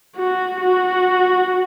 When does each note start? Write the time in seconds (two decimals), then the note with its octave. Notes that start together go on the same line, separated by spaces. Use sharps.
0.17 F#4
0.60 F#4